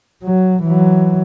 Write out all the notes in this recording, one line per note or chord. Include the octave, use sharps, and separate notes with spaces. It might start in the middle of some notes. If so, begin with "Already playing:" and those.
F#3
E3 F#3